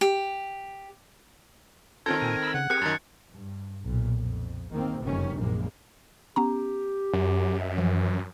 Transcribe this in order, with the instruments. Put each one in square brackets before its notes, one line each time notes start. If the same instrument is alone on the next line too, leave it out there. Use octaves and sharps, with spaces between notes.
[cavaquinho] G4
[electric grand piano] D#3 C4 A4 [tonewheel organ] C#4 F4 G6 [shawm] A#4 [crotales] G#6
[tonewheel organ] A#2 G#5
B5 E6
[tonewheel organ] C#3 [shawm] F#5
[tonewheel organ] C4 G#4 A#4 [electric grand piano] G4 [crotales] F#6 C#7
[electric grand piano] F#2 D#3 [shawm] A5 [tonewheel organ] A#5
[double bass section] G2
B1 A#2
F2
G#1 E2 D#3 A#3 C4
F#1 F2 C3 D#3 G3 C#4
A#1 F#2 G#3 A#3
[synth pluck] B3 C#4 A#5 [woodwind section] G4
[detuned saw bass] F#2
[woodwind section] D#5 E5
[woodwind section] E3 [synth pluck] F3